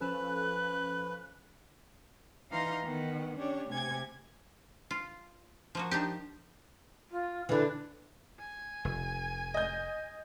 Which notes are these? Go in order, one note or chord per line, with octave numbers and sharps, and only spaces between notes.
F3 C#4 A4 B4 F#6
E3 D#4 F5 A#5 C6 F6
D#3 B3
C#4 D4 G4 C#5
C3 A3 G#5 G#6
F4
F3 A#3 F#4
F3 D4 D#4 G4
F4
D3 E3 D4
G#5
F1
D#5 G6